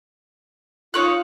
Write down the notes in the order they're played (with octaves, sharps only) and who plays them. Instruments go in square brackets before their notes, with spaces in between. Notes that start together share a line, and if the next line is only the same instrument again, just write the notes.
[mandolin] D#4 C#5 F#6 [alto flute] F4